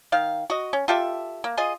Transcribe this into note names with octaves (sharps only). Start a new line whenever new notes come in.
D#3 F5
F#4 D#5
C#4
F4 G4 A4 E5
A#3
F4 G#4 D#5